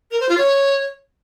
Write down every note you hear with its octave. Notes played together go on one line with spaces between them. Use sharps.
A#4
C5
F4
C#5